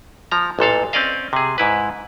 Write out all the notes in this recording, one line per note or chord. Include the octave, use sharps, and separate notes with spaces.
F3 A#5
A1 A#2 A4 F5
C4 C#4 D5 D#5 F5
C3 G#4
G#2 E4 B4